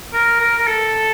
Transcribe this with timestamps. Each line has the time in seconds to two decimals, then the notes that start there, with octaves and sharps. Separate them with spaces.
0.13 A#4
0.40 A#4
0.58 A#4
0.67 A4